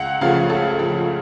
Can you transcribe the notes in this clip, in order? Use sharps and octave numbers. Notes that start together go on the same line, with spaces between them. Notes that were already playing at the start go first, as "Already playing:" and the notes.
Already playing: C#2 F#5
C#3 F3 A3 F5
C#2 A4
C#3 F3 A3